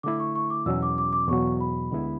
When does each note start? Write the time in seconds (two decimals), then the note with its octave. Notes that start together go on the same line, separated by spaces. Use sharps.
0.03 D3 A3 E4 D6
0.20 C#6
0.35 C#6
0.50 D6
0.66 E2 B2 F#3 C#4 E6
0.83 D6
0.98 D6
1.13 D6
1.28 E2 B2 F#3 C#6
1.60 B5
1.91 D2 D3 G#3 B3 E4